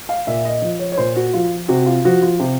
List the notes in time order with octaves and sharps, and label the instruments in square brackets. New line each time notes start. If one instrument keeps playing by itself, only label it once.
[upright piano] F5
A#2 E5
D#5
F3
C#5
C#5
A#2 C5
F#4
F3 F4
C3 F#4
F4
F3 F#4
F4
C3